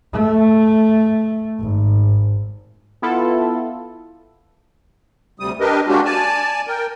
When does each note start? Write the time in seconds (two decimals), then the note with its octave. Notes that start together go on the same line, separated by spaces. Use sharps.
0.13 A3
1.59 G#1
3.02 B3 E4 F4 A4
5.40 D2 C3 G3 D#6
5.60 D4 G4 A#4 B4 D#5
5.87 G#3 A#3 C#4 D4 F#4 G4
6.05 D5 G#5 A5
6.67 A#4 G5